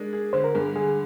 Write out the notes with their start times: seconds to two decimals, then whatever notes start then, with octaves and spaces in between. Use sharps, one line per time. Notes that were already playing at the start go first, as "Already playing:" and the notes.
Already playing: G#3 D4 A#4
0.13 G#4
0.33 D3 C5
0.44 A#4
0.54 G2 G#4
0.75 D3 G#4